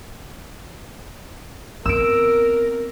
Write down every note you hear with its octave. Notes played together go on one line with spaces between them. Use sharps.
B3 C4 A#4 E6 D7